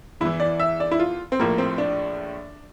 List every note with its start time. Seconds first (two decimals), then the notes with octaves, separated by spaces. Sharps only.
0.21 E2 E3 E4
0.40 D5
0.60 E5
0.80 D5
0.91 E4
0.99 F4
1.32 C4
1.39 A#1 A2 F3 A#3
1.58 C4
1.78 D4